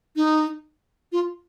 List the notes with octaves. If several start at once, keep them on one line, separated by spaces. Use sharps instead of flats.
D#4
F4